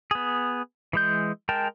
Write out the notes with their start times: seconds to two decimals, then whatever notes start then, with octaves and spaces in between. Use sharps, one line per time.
0.11 B3 G#4
0.93 E3 G#3 G6
1.49 G#3 A#4 G5 A5